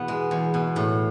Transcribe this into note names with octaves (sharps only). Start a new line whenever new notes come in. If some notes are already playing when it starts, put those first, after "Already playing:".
Already playing: E2 B2 B3
G#3
E2
B2
A2